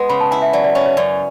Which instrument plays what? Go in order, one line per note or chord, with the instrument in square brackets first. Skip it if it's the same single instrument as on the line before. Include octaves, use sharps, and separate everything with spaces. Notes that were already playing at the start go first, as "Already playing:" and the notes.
Already playing: [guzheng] G#3 B3
[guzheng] C#3 [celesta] B5
[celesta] A5
[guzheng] E4 [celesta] G#5
[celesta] E5
[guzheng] F#3 [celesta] D5
[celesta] D5
[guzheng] C#4 [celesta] C#5
[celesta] C#5
[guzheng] F#2 [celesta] D5